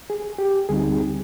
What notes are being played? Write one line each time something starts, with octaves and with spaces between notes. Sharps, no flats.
G#4
G4
D2 D3 G3 C4 D#4 G#4